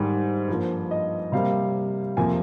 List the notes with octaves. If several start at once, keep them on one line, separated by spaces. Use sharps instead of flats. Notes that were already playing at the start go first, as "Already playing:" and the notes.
Already playing: G#2 D#3 G3
G2 F3 A#3
D#5
C3 G3 A#3 F5
F2 C3 F3 A#3 G#5